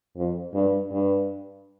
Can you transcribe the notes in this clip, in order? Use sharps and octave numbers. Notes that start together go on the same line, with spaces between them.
F2
G2
G2